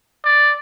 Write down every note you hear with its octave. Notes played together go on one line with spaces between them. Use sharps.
D5